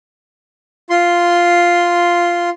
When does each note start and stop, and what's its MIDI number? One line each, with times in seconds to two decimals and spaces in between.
0.90 2.50 65
0.90 2.50 84